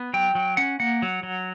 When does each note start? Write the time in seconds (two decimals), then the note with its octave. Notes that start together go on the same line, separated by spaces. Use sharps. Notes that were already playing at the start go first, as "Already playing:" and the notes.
Already playing: B3
0.14 F#3 G5
0.35 F#3
0.57 C#4 F#5
0.80 A#3 F#5
1.02 F#3
1.23 F#3